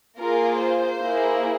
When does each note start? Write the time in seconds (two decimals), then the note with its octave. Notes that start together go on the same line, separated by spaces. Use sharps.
0.18 A#3 F4 G#4 A#4
0.60 C5
1.01 A#3 E4 G#4